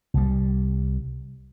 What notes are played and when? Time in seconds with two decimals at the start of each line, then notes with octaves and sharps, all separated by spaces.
0.14 C2 G3